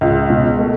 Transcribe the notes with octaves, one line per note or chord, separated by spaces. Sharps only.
C#2
B2
A3